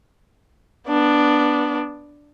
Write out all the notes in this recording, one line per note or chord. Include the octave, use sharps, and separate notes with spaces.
B3 D4